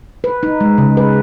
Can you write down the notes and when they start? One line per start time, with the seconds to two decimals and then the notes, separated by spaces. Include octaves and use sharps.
0.24 B4
0.43 D#4
0.61 G#3
0.78 C#3
0.97 B4